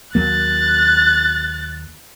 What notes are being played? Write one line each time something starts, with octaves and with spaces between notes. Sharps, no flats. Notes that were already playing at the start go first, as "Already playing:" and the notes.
D#2 F#3 A#3 F#6 A6